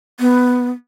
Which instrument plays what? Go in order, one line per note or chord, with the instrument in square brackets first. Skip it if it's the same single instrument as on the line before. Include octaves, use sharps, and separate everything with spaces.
[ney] B3